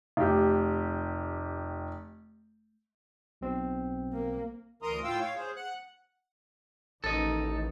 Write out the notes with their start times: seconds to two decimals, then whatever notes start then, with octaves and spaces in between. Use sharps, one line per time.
0.17 F1 G4
3.41 B1 B2 C4
4.13 A#3
4.82 D2 E3 A#4 A#5 C6 D#6
5.04 A2 F4 F5 G5 E6
5.20 C#5 F5
5.35 G#4 C5
5.56 F#5 F#6
7.04 A1 D#3 D#4 A4 D#5